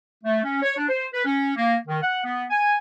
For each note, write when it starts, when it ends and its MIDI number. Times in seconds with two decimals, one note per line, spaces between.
0.24 0.39 57
0.44 0.60 61
0.62 0.75 73
0.76 0.87 62
0.89 1.06 72
1.13 1.25 71
1.25 1.51 61
1.56 1.76 58
1.87 2.01 51
2.02 2.23 78
2.24 2.45 59
2.50 2.76 80